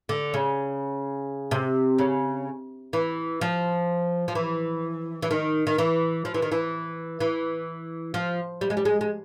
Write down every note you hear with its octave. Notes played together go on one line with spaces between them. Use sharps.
D3
C#3
C3
C#3
E3
F3
F3
E3
E3
D#3
D#3
E3
F3
E3
D#3
E3
E3
F3
G3
G#3
G3
G#3
G#3